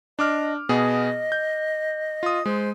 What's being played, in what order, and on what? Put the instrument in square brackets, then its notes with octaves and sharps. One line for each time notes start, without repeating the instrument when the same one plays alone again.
[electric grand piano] D4 D6 F6 [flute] D#5
[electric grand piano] B2 B3 G#4 [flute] D#5
[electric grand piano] G6
F4 D#6
[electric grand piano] G#3 [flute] C5